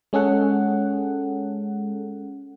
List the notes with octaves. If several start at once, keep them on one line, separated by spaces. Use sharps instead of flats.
G#3 C#4 G#4 A4 F#5